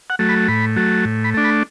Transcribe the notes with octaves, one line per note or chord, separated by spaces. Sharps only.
F#5
F#3 A3
B5
A2 B5
F#3 A3
A2
B5
A3 D4
B5